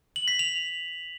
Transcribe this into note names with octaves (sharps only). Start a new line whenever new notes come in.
F#7
B6
F7